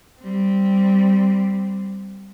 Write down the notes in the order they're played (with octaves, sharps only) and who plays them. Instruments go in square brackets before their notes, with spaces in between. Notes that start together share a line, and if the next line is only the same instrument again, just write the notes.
[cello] G3 C4